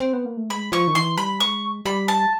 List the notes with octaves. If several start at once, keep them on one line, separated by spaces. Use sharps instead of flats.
C4
B3
A#3
A3
G#3 B5
F3 C#6
D#3
E3 C6
G3 B5
G#3 C#6
G3 B5
A5